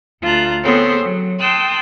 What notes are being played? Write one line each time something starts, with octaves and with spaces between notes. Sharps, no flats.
D2 F4 A5 A#5 F#6
B3 C4 G#4 A4 C5 C#5
F#3
G5 A5 C6 D#6 E6 F#6